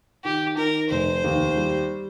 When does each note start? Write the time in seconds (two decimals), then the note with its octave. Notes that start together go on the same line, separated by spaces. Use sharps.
0.24 D#3 G4
0.57 D#3 A#4
0.90 F1 C5
1.24 D#2
1.57 G3